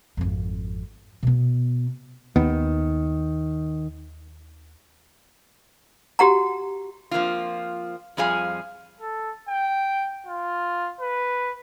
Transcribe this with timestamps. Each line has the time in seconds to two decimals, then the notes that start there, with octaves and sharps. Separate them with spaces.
0.17 G#1 F2
1.23 B2 B3
2.36 D#2 D#3 B3
6.19 F#4 G4 F#5 A#5
7.11 F3 A#3 C4 F4
8.17 F2 F3 G3 G#4 F5 G#5
9.01 A4
9.49 G5
10.27 F4
11.00 B4